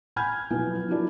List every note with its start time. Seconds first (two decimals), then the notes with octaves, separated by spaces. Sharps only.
0.16 F#5 G#5 B5 F6 G6 G#6
0.51 B1 F3 E4 B4 G#5
0.88 F3 F#3 A#3 D4 E4